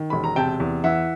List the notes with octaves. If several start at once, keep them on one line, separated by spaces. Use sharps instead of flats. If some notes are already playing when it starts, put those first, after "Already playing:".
Already playing: D#3
E1 B5
A#5
C3 G5 A5
E2
E3 E5 F#5